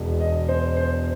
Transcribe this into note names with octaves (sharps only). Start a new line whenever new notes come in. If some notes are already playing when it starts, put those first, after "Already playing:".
Already playing: E1 E2 B2
D#5
C5
C5